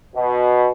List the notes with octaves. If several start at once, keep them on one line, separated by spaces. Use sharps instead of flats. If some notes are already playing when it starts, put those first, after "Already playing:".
B2